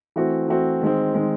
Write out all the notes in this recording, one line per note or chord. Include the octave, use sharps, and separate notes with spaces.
E3 A3 C4 F#4
E3 A3 C4 F#4
D#3 G#3 C4
D#3 G#3 C4